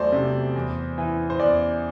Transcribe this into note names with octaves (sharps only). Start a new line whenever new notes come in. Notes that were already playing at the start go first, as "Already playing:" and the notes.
Already playing: E2 F#3 A3 C5 D5
C3
E2
E3
C5
E2 D5